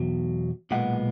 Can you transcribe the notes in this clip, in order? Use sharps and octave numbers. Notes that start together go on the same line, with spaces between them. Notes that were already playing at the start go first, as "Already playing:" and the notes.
Already playing: E2 B2 F#3
B1 A#2 G#3 B3 F#5